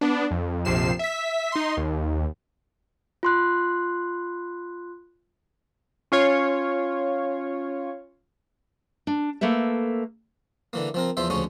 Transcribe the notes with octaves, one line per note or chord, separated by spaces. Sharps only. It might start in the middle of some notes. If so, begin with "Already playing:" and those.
B3 D4
F2
A#1 F2 C3 F3 C7 E7
E5 B6
D#4 C6
D#2
F4 C6 F#6
C#4 F4 C#5
D4
A3 A#3 A4 B4 E5
D3 E3 A#3
F3 C4 A#4
E2 F3 C5 E5
D2 F3 G#3 C#4 C#6